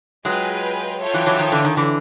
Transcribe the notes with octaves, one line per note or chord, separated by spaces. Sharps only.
F#3 G#3 F4 G#4 B4 D#5 G5
F4 A4 C#5 E5 G5
E3 F#3
E3 F#3
D#3 F3
D3 E3
D#3
D3 E3